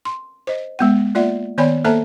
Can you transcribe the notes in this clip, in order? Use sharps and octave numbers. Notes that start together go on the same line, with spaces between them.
C6
C5 D#5
G#3 B3 F#5
A#3 F4 D5 E5 F#5
D#3 B3 C#5 D5 G#5 B5
A#3 A4 C5 E5 A5 A#5